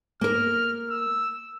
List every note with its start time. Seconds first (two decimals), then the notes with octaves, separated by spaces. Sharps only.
0.21 A#3 A#4 F6
0.90 E6